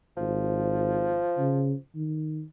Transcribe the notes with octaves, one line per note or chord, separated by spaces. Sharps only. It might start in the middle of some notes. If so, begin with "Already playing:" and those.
G#1 F3
C#3
D#3